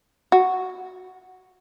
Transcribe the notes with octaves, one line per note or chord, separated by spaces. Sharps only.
F#4